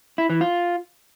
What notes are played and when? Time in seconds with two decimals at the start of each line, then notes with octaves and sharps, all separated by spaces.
0.18 E4
0.30 E3
0.41 F4